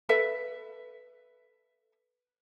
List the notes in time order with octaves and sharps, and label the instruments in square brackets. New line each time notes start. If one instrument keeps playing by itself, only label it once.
[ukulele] A4 B4 E5